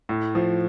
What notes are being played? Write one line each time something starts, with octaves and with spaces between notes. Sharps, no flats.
A2
F3